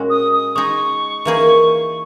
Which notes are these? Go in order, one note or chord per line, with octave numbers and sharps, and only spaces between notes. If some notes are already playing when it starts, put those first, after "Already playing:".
Already playing: A#2 G#3 C#4 F#4
D#6
D#6
G#3 D#4 G#4 C#6
E3 A#3 D#4 G#4